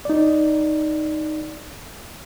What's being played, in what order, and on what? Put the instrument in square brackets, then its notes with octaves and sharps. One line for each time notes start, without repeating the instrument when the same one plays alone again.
[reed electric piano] D#4 D5